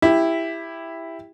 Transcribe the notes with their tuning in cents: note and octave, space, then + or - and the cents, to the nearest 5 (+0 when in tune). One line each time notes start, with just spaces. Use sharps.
E4 +5 G4 +15